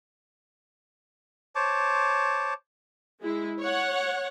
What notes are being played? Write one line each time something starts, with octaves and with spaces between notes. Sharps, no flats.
C5 C#5 A5 D6
G#3 E4
C#5 F#5